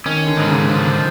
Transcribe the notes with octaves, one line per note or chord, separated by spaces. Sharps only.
D#3 C#4
D3
G#2
C#3
D3 F3